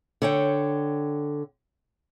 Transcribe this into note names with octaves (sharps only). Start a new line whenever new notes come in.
D3 C#5 G5